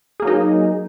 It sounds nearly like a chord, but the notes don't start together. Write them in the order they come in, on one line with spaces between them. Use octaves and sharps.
G#4 A#3 F#3 D#4